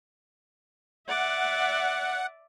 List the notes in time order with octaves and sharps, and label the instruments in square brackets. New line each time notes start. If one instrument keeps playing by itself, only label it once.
[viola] D5 E5 [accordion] F#5